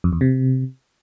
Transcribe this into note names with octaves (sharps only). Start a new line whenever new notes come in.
F2
E2
C3